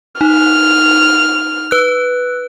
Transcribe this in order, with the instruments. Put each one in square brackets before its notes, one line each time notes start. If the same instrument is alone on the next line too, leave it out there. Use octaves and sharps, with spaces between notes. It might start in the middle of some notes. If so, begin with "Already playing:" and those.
[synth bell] D#4 [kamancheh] F6
[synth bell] B4 F#6